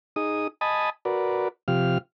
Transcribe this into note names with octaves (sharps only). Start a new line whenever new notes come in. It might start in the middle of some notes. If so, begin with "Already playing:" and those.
D#4 G#4 D#6
D#5 G#5 A5 B5 D#6
F#4 A#4 B4 D5
C3 F3 G4 F5 F6